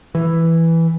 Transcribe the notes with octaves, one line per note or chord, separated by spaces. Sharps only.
E3